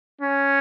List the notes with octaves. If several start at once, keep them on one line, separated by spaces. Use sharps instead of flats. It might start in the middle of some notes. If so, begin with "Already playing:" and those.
C#4